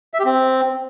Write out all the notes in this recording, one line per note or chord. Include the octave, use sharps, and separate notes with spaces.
E5
G4
C4